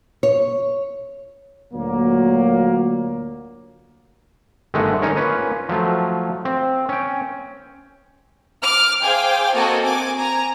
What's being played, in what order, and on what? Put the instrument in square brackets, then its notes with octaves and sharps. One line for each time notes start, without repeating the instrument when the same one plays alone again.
[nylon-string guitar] C#5
[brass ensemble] D2 A#2 F#3 A#3
[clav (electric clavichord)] G1 D#3 G#3 A3 D#5 F#5
C#4 D#4 A#4 C#5
A#3 C#4 F4 B4
F3 F#3 A3 F4
C4
C#4 G5
[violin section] D6 F6
G#4 C5 F5 G5 G#5 D6
A#3 C4 F#4 A4 D#5 G#5
C4 G#5 D6
G#5 A#5